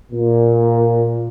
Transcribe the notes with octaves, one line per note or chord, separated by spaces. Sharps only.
A#2